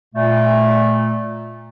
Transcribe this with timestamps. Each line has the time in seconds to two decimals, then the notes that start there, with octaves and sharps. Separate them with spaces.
0.15 A#2 A3